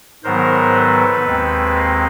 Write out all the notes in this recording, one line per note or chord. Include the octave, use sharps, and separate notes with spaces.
G#2 D#3 F#3 B3 A#4 C5
A4 B4
D#2 D#3 G#3 C4
D#5 F5